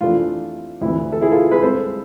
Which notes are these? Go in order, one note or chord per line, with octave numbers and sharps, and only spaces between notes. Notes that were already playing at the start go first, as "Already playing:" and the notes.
F2 C3 E3 A3 D4 F4
D2 C3 E3 E4
A4
E4 G#4
F4 A4
G#4 B4
C2 C3 G#3 A4 C5